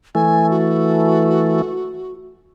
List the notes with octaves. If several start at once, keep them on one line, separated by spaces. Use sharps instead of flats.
E3 A3 G#5
F#4